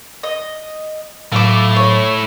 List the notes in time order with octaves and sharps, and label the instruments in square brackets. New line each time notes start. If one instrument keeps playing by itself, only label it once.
[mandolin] D#5
[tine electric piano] A2 F#3 [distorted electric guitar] A3 E4 [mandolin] F5 D6
[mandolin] C#5